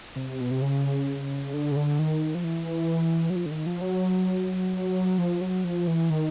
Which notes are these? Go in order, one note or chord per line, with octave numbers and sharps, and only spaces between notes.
C3
B2
C3
C#3
D3
C#3
D3
D#3
F3
E3
F#3
F3
D3
D#3
F3
F#3
F3
F#3
F3
E3
D#3